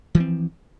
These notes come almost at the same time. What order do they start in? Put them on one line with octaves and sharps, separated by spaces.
E3 F3 C4